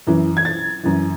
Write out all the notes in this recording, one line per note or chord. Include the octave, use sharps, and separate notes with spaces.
F#2 E3
G#6
A6
F#2 E3